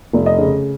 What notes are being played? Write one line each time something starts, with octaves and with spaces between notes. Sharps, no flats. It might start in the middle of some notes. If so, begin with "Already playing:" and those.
F1
D#5
C#3